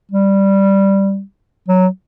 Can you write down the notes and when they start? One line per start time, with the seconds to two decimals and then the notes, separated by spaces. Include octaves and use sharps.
0.12 G3
1.69 F#3